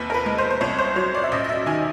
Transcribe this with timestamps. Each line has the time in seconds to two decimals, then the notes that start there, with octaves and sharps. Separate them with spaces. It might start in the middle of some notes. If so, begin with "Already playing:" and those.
Already playing: D#2 C3 B4
0.10 A#4
0.14 B4
0.26 G#3
0.38 C5
0.51 C5
0.61 C2 C#5
0.79 C5
0.96 F#3 C#5
1.14 D5
1.24 E5
1.32 A1 D#5
1.44 D#5
1.49 E5
1.66 D#3 G#5